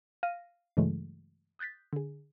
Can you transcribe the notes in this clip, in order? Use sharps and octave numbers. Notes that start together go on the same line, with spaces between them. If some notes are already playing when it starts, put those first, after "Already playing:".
F5 F6 A#6 D#7
G2 C#3 E3 F#3 G#3 A3
D#6 F#6 G6 A6 B6
D3 G#4